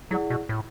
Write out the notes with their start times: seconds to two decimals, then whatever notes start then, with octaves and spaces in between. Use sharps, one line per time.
0.11 F#3 E4 G#4 D5 F#5
0.30 B2
0.49 A2